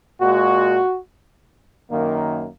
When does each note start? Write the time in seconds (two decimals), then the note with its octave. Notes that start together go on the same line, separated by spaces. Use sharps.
0.21 A#2 G#3 F#4
1.90 F#2 D#3 A#3